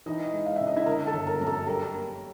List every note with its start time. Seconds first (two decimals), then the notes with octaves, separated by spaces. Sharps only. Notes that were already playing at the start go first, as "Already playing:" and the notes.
0.06 E3 D#4 D#5
0.33 G#3
0.46 F5
0.56 C#3 E5
0.67 D#5
0.76 E4 E5
0.86 D3 A#4 A#5
1.06 A4 A5
1.13 G1
1.27 A#4 A#5
1.41 F#2 A#5
1.46 A4 A5
1.67 G3 A#4 A#5
1.94 A#3